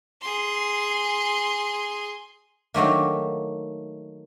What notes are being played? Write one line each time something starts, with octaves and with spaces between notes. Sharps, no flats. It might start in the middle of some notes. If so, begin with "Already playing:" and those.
G#4 C6
D#3 F#3 A3 A#3